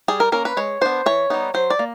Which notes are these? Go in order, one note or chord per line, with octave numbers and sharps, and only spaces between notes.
G3 G#4
A#4
A#3 C#4 A#4
B4
G#3 C#5
B3 D4 C5
E3 C#5
G3 B3 D#4
F#3 C5
D5
A#3